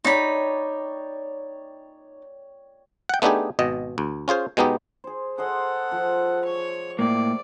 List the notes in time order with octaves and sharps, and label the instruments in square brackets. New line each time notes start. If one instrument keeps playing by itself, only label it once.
[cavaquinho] D#4 B5 [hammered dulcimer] C#5 D5 G5
[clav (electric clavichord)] F#5 G5
A3 B3 D4 D#4 G4 G#4
G#1 B2 D#5
D2
C#4 F4 G#4 C5
B2 G#3 B3 D#4 G4
[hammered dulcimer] G#4 C5
[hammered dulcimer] G#4 C5 D#5 [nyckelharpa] A4 F#5
[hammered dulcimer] F3
[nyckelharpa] C#5 C#6
[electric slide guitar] A2 A#3 [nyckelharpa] D5